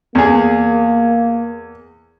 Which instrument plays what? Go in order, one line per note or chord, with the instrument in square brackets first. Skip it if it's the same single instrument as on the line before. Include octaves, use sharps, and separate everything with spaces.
[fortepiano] E2 G#4 [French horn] A#3